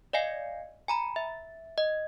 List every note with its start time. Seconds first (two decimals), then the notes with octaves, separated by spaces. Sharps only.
0.13 D5 D#5 F5 G#5 C7
0.88 G#5 A#5 B5
1.16 E5
1.78 D#5